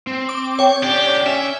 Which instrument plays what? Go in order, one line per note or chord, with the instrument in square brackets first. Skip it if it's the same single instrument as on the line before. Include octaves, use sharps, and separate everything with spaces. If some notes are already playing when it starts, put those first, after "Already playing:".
[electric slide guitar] C4
[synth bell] D6
C#5 G5
[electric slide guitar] D3 C#4 D5 [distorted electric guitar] G4
[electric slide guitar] C#4 [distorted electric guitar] E5